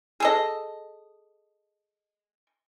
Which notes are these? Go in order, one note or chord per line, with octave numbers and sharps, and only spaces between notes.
G#4 A4 D#5